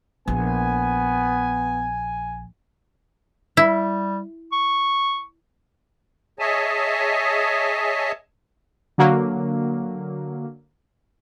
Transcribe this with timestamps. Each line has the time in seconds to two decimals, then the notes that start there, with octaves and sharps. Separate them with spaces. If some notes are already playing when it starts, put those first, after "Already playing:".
0.28 A#1 B3 G#5
3.57 G3 E4
4.52 C#6
6.39 G#4 C#5 D#5 E5 G#5 A5
8.98 D3 F#3 A#3